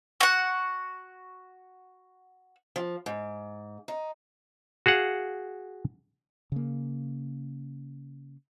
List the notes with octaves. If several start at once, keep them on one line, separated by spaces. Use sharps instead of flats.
F#4 F#5
F3
G#2
D#4
F#4 G#4 F5 F#5
C#3 A#3